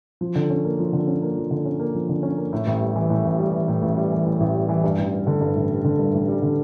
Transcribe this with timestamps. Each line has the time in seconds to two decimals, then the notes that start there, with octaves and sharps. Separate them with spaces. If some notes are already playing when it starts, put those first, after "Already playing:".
0.21 F3
0.35 D3
0.50 C#4
0.65 A#3
0.79 F3
0.93 D3
1.08 C#4
1.22 A#3
1.36 F3
1.51 D3
1.65 C#4
1.80 A#3
1.95 F3
2.09 D3
2.23 C#4
2.38 A#3
2.53 A2
2.67 A1
2.81 G3
2.96 E3
3.10 A2
3.24 A1
3.39 G3
3.53 E3
3.68 A2
3.82 A1
3.97 G3
4.11 E3
4.26 A2
4.40 A1
4.55 G3
4.69 E3
4.84 G2
4.98 A1
5.12 G3
5.27 D3
5.41 G2
5.55 A1
5.71 G3
5.84 D3
5.99 G2
6.14 A1
6.28 G3
6.42 D3